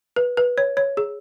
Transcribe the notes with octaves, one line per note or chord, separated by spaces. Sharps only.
B4
B4
C#5
C#5
G#4